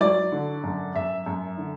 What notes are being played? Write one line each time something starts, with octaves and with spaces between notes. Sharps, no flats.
F#3 D5
D3
F#2
F#2 E5
F#2
D3